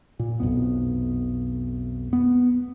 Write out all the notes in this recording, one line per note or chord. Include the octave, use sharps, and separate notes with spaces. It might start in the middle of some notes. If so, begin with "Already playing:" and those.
A#2
B1 F2 B3
B3